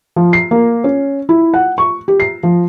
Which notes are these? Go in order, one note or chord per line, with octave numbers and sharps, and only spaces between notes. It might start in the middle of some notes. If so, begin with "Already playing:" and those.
F3
C7
A#3
C#4
E4
F#5
C#6
G4
C7
F3